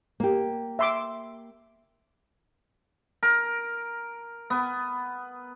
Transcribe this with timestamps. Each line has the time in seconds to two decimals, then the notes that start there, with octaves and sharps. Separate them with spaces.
0.20 A#3 G4
0.79 E5 C6 D6
3.23 A#4
4.50 B3